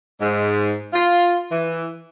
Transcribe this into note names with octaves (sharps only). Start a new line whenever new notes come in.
G#2
F4
E3